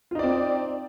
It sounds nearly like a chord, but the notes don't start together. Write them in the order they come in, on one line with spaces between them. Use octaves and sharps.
F4 D#4 D5 C4